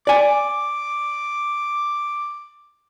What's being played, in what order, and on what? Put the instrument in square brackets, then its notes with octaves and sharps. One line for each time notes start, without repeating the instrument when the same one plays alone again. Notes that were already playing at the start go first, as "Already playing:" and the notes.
[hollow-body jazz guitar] D5 G#5 [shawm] D6